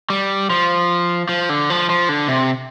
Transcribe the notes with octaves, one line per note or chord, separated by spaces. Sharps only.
G3
F3
F3
D3
F3
F3
D3
C3